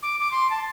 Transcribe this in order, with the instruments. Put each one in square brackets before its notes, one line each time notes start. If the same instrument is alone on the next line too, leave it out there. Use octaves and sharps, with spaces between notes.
[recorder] D6
D6
C6
A5